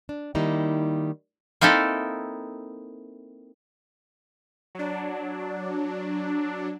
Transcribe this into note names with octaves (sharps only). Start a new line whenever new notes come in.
D4
D#3 G3 A#3 D#4 E4
A#3 C4 D#4 E4 A4
F#3 D4